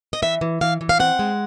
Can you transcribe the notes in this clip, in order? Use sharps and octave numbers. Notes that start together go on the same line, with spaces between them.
D#5
E3 E5
E3
E3 F5
E3
F5
C4 F#5
G#3